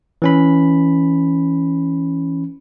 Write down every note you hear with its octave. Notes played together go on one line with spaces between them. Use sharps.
E3 C#4 B5